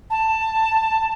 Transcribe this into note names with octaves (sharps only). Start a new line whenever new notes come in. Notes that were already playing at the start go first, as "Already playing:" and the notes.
A5